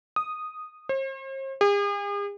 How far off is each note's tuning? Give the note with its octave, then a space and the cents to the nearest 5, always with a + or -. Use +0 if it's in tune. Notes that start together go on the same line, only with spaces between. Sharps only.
D#6 -5
C5 +45
G#4 -45